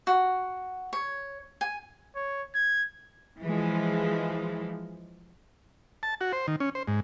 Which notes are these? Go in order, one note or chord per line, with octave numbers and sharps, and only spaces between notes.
F#4
C#5
G#5
C#5
G#6
E3 F3 G#3
A5
F#4
C5
D#3
C#4
C5
G#2